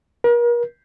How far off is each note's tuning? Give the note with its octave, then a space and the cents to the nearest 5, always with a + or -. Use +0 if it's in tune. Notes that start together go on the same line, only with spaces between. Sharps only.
A#4 +40